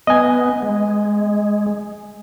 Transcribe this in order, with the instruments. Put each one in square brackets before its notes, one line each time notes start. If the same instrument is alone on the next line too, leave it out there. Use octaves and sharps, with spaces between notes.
[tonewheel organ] B3 [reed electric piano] D#5 G#5
[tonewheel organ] G#3